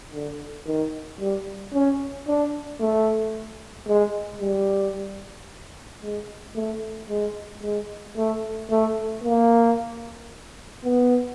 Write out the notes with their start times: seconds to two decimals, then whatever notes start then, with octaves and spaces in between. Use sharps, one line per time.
0.13 D3
0.66 D#3
1.21 G3
1.73 C#4
2.27 D4
2.81 A3
3.88 G#3
4.41 G3
6.02 G#3
6.56 A3
7.09 G#3
7.63 G#3
8.17 A3
8.71 A3
9.24 A#3
10.84 B3